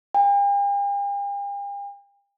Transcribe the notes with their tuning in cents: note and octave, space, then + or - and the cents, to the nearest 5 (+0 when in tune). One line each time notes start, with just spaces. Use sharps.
G5 +45